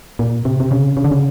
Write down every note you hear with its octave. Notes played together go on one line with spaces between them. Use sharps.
A#2
C3
C3
C#3
C#3
D3
C#3